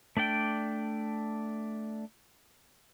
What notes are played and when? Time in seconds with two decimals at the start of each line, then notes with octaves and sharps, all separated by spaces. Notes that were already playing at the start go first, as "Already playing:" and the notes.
0.17 A3 D4 D5 G5